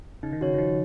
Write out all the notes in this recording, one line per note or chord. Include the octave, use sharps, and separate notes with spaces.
C#3 D#4
D#3
C#3 F#4 C#5
D#3
F3 D#4